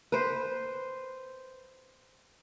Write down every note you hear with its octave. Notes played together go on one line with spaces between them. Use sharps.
B4 C5